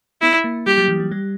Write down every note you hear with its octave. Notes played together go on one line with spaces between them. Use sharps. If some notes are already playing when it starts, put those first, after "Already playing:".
B3 E4
A#3
G3 G4
F#3
E3
F#3
G3